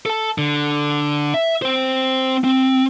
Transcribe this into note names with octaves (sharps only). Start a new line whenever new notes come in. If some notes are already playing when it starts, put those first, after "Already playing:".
A4 A5
D3
E5
C4 C5
C4